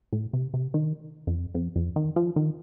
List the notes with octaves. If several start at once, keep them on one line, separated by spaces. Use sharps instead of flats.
A2
C3
C3
D#3
F2
F2
F2
D#3
F3
D#3